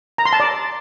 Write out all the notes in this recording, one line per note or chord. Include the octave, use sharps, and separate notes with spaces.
A#5
C6
A5
D5